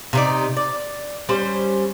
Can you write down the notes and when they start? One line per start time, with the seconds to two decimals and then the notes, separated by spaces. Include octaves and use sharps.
0.13 C3 D#4 D5
0.57 D5
1.29 G3 C#4 C5